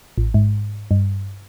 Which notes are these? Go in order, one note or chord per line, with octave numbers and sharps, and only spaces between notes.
A1
G#2
G2